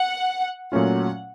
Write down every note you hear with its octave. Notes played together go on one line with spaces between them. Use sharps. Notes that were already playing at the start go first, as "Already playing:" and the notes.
Already playing: F#5
A#2 F#3 A3 C#4 F4 F#5